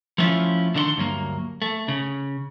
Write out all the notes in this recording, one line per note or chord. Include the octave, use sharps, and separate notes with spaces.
F3 A3 B3 C#4 E4 F4
D3 D#3 D4 E4 F#5 C6
D2 G2 F#3 A#3
A3
C#3